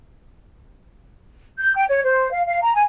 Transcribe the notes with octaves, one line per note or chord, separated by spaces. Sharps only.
G6
G5
C#5
C5
F5
F5
A#5
G#5